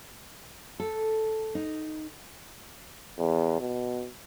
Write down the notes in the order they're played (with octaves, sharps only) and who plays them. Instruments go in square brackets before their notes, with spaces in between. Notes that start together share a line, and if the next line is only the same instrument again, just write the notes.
[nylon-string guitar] A4
D#4
[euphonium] E2
B2